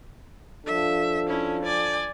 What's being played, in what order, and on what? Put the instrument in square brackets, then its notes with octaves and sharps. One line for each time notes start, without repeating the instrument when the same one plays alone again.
[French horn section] F3 D4 A4 [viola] E5
[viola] C#4 E4
D5 G#5